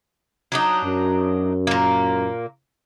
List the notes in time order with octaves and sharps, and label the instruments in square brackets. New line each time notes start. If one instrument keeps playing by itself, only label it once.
[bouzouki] F#3 D4 D#4
[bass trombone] F#2
[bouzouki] A#2 A#3